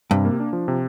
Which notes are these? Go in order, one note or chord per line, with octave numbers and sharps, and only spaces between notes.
G2 C3
A#3
D4
F3
C3